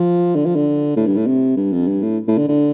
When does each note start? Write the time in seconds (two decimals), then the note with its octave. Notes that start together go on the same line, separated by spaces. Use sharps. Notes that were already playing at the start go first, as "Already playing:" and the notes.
Already playing: F3
0.35 D3
0.46 F3
0.55 D3
0.96 A2
1.06 G2
1.16 A2
1.27 C3
1.57 G2
1.72 F2
1.87 G2
2.02 A2
2.27 A2
2.38 D3
2.48 D3